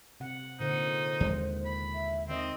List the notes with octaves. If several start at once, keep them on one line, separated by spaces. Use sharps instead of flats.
C3 F#5
A#2 D3 D#4 C5 F#5
D#2 G#3
B5
E5
D#3 C4 D#5